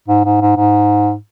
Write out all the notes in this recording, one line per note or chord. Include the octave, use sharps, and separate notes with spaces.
G#2
G#2
G#2
G#2